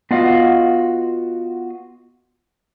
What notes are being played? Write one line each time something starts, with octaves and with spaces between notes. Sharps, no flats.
B3 F4 F#4 D#5 F5